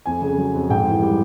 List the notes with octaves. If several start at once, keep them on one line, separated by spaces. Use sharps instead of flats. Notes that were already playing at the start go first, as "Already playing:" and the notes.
F2 G#5
C#3
F#3
F2
G#2 G5
E3
G3